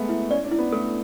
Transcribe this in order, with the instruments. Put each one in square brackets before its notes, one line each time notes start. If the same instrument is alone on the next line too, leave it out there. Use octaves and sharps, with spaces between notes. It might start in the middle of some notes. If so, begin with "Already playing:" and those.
Already playing: [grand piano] G#3 A3 B3 [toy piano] E5
[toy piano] E4
[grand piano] C#4 [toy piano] D5
[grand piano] D4
[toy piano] E4
[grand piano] B3
[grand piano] A3 [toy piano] A4